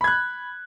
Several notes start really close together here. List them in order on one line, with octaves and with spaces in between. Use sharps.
B5 G#6 F#6